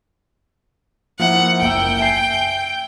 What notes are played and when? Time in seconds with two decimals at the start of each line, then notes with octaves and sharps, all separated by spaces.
1.19 F3 A#3 E4 F#5
1.61 F#1 A#3 G5 E6
1.98 E5 G#5 C7